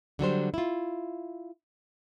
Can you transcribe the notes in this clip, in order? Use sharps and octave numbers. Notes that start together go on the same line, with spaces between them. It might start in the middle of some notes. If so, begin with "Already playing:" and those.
D3 F#3 G3 C5
E4 F4